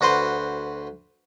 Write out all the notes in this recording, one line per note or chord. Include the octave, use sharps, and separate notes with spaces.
D2 F#4 B4 C5 C6